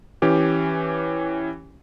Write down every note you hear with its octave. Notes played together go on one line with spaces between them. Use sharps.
E3 C#4 G4